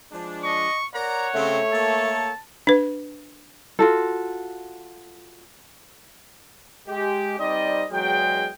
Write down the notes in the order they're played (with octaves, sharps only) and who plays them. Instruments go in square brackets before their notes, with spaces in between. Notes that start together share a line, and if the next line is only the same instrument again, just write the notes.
[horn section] F3 G#3 D4
[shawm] D#5 [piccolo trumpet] C#6
[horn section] A#4 D5 A#5 [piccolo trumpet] C#5 [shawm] F#5
[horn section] C#3 C4 [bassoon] A3
[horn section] A#3 A4 [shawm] A5
[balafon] D4 B4
[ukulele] F4 F#4 A4
[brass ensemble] G#3 G4
G3 C4 D#4 C5 D5 D#5
E2 F#3 G#3 G5